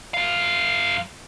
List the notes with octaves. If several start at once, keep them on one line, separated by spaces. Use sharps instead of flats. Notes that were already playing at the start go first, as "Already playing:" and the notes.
F#2 F5